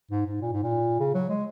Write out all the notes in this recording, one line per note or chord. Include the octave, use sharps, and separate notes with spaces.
G#2
G#2
A#2
G#2
A#2
C#3
F#3
G#3